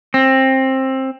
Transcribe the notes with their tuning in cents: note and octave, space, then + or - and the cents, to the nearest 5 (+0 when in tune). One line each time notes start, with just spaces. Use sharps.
C4 +20